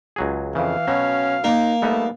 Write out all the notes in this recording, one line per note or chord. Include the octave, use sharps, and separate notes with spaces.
C#2 F#3 G#4
F2 C#3 E3 F5
B2 F#3 C#4
A#3 D#4
G3 A3 B3 D#4